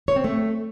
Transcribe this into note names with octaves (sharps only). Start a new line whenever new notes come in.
C#5
C4
A3